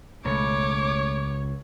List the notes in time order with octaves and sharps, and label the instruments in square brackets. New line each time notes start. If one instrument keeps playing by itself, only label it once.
[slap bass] C#2 [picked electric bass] B2 A3 [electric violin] C#5 [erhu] D6